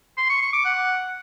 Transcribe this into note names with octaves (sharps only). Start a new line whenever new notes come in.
C6
C#6
C#6
D6
F#5